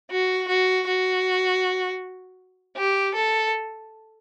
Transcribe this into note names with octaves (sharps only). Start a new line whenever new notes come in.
F#4
F#4
F#4
G4
A4